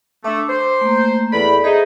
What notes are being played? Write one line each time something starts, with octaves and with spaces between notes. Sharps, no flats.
A3 D4 D6
C5 D6
A3 A#3
E2 A4 D5 B5
D#4 G#4 C5 E5